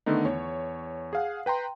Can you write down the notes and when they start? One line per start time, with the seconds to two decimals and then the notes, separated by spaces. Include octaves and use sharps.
0.06 D3 D#3 A3 B3 D#4
0.25 E2 C#5
1.13 G#4 F5 F#5
1.46 B4 G5 A#5 C6